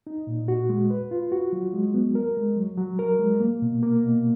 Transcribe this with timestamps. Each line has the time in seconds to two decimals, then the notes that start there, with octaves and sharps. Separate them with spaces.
0.07 D#4
0.27 A#2
0.48 F#4
0.69 G#3
0.90 B4
1.11 F4
1.32 F#4
1.53 F#3
1.73 G#3
1.94 B3
2.15 A#4
2.37 G#3
2.57 F#3
2.77 F#3
2.99 A#4
3.19 G#3
3.40 A#3
3.62 B2
3.83 A#3
4.04 B2